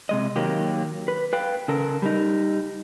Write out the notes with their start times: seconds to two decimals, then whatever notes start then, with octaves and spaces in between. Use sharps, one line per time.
0.09 C3 G#3 D#5
0.36 D#3 F#3 A#3 G4
1.08 B4
1.33 B4 F5 G5
1.68 C#3 A4 A#4
2.02 G3 D#4